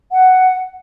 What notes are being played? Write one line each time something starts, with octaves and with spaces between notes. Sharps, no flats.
F#5